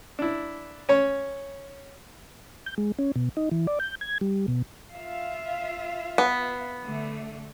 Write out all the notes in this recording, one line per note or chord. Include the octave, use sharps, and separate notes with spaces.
D4 E4
C#4 C#5
G6
G#3
C#4
B2
D#4
E3
D5
G6
G#6
G3
B2
F4 E5 F5
B3
D3 A3